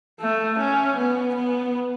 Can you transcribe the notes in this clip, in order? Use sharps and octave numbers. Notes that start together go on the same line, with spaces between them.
A3
C#4
B3
B3